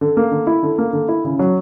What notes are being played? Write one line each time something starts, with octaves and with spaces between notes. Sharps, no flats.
D3
A#3
D3
E4
D3
A#3
D3
E4
C#3
F#3